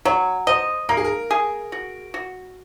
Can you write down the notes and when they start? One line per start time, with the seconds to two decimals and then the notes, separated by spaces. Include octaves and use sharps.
0.05 F#3 C#5
0.47 C5 D#5
0.89 A#3 A#4
0.97 G#4
1.04 A#4
1.31 G#4
1.72 F#4
2.14 F#4